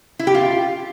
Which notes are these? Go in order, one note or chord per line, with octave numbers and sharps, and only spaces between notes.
E4
G4
F4